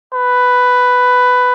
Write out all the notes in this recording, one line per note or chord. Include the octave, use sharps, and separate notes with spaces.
B4